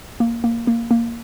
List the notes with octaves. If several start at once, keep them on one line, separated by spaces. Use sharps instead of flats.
A#3
A#3
A#3
A#3